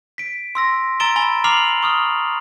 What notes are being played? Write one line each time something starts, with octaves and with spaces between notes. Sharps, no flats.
B6 D7
C6 E6 A#6
A#5 E6 A6 D7 E7 G7
G#5 B5 E6 A6 G7
A#5 D6 F6 C7 F7 F#7
C#6 D#6 F6